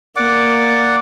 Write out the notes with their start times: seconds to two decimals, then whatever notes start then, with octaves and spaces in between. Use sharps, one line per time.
0.16 A#3 D5 F#5 D6